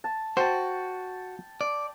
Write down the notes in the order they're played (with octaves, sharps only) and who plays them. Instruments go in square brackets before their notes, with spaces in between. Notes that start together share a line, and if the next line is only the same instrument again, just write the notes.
[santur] A5
[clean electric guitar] F#4 [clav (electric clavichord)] C5 [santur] G5 A5
[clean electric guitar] D5